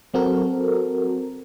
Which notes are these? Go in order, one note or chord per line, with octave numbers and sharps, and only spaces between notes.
F#3 C4 F#4 A4 A#4